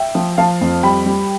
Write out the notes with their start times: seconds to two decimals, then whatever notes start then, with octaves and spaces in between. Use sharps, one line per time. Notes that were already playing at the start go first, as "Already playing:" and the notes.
Already playing: E5 G5
0.15 F3
0.38 F3 F5 A5
0.61 F2
0.83 G3 G5 B5
1.06 G3